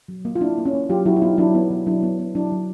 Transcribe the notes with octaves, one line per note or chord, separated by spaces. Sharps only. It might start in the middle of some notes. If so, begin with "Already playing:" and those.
F#3
A#3
F4
A#3 D4 E4
A#3
C#4
A#3
F#3 F4 G4
F#3 E4 F#4
E4
B3 D#4 F4
F#3 D4 E4
B3
F#3
F#3 D4 E4
B3
B3
F#3 D4 E4
F#3